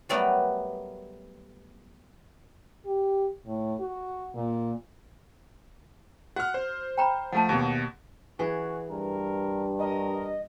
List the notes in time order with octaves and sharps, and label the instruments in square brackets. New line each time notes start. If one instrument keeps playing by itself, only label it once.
[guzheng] F#3 G3 A3 B3 A#4 B4
[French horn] G4
A2
F#4
A#2
[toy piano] F#4 [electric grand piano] F#5 F6
[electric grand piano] C5
[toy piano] G5 A#5 B5
[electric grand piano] F3 A3 [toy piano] F#5 A5
[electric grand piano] D#2 B2
[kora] E3 G#4 [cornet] F#4
[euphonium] G2 [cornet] A#4
[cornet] A#4 [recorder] D#5